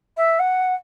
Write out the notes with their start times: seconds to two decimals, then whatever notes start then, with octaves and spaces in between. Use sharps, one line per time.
0.17 E5
0.39 F#5